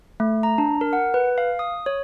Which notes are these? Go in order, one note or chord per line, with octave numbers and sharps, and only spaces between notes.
A3
A#5
D4
A#4
F#5
B4
F5
D#6
C#5